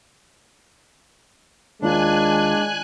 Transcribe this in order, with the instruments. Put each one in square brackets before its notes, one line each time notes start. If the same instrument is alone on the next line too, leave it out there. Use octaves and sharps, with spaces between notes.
[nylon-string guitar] D#2 F4 [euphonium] G#3 [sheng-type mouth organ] D4 [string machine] G#5 F#6